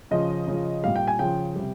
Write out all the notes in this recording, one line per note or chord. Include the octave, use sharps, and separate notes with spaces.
C#3 F3 D#5
C#3 F3
A#2 G3 F5
G5
G#5
C#3 F3 G5
C3 G3